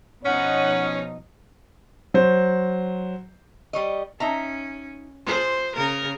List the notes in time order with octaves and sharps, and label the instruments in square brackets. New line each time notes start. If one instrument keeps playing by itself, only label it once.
[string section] B2 F3 D#4 [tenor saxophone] C#4 [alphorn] C#5 [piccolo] F#5
[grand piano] F#3 C5
[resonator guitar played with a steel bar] G3 C#5 D#5
[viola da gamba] C#4 [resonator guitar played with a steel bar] D#4 E5 A#5
[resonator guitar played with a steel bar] F4 G#4 [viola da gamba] C5
[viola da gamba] C#3 A#4